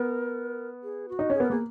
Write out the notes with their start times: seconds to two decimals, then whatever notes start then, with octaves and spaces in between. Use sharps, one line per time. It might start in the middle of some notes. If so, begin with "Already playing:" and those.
Already playing: B3 A#4
0.83 G#4
1.09 F#4
1.19 D#4
1.30 C#4 G#4
1.40 B3 A#4
1.50 A#3 G#4